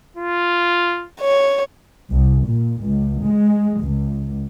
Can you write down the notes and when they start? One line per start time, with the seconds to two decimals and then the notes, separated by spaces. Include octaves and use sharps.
0.16 F4
1.21 C#5
2.10 C2
2.46 A#2
2.84 C#2
3.23 G#3
3.82 C#2